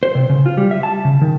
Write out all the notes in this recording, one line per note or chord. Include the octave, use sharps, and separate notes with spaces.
C5
C3
C#3
F4
G3
E5
A5
C#3
D#3